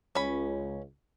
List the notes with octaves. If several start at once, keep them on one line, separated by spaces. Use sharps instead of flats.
C#2 C#4 B5